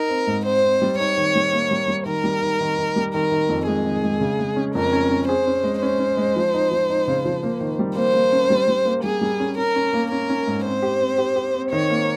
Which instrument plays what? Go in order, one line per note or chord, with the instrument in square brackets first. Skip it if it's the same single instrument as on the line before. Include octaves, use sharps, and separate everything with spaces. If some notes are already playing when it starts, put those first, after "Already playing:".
Already playing: [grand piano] D#4 [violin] A#4
[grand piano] C4
G#2
[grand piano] C4 [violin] C5
[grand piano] C4
G3
[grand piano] D#4 [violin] C#5
[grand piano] D#3
G3
A#3
G3
G3
[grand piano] D#3 [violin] A#4
[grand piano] G3
D#3
D#3
D#3
G3
[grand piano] D#3 [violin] A#4
[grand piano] D#3
F2
[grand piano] G#3 [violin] G#4
[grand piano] D#3
G#3
C#3
G#3
C#4
[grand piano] F2 [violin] A#4
[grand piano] C#4
C#4
[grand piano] G#4 [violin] C5
[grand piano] C#4
G#3
[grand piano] C#4 [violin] C5
[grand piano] C#4
G#3
F3
D#4
F3
D#4
C#3
F3
A#3
D#3
G3
[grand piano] A#3 [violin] C5
[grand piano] A#3
C#4
G3
G3
A#3
[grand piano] G3 [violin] G#4
[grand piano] G3
C#4
[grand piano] C#4 [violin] A#4
[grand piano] C#4
A#3
[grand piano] C#4 [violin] A#4
[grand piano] C#4
G#2
[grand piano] C4 [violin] C5
[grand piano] G4
C4
G4
G4
C4
[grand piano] D#3 [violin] C#5
[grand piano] A#3